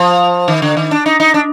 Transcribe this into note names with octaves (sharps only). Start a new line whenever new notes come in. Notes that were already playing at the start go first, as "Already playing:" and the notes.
Already playing: F3
D#3
D3
D#3
D4
D#4
D#4
D4